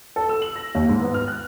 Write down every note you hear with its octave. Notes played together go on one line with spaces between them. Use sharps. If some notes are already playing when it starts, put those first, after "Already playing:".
A4
E6
F#7
A#6
D#2
G#2
B3
F6
F#6